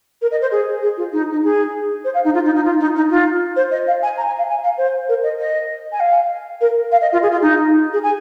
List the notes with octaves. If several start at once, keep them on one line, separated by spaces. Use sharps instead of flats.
A#4
D#5
C5
G#4
G#4
F4
D#4
D#4
G#4
C5
F5
D#4
F4
D#4
D#4
F4
D#4
D#4
F4
C5
D#5
F5
G#5
A#5
G#5
F5
G#5
F5
C5
A#4
D#5
D#5
G#5
F5
A#4
F5
D#5
F4
G#4
F4
D#4
G#4
G#5